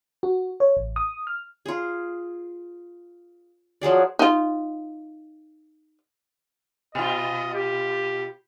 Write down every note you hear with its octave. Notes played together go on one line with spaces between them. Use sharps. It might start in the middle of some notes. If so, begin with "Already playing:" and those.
F#4
C#5
A1
D#6
F6
F4 G#4
F3 F#3 G#4 D5
D#4 F4
B2 F4 D#5
G4